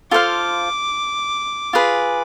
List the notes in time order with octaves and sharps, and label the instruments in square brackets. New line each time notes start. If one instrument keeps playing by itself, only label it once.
[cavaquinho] F4 A4 C5 F5 [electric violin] D6
[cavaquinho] F4 G#4 B4